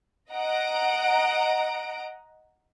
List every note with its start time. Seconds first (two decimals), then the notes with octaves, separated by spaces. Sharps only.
0.33 D#5 F#5 A#5 D7